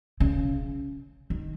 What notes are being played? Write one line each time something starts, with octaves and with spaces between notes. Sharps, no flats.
C#3
D#3